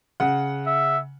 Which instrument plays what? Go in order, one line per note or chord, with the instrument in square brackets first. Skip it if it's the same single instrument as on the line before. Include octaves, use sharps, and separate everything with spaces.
[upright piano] C#3 F#5
[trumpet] E5